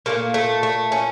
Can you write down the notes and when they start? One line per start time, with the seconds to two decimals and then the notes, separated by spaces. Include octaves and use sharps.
0.06 A#2 F3 A3 A#3
0.34 A3
0.63 A3
0.92 C#4